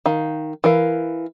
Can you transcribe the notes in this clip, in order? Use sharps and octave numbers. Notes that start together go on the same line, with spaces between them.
D#3 F5
E3 A#4 F5